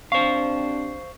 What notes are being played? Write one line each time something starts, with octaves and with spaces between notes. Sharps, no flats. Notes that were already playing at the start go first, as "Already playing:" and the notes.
C3 C4 D4 C5 F5 C#6